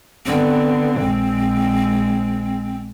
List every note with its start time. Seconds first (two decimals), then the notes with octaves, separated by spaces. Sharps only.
0.26 D3 B3 C4
1.00 A#1 G#3